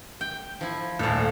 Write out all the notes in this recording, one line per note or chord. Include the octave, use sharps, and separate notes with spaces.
G5
F3 E4
D#1 A#1 A4 F5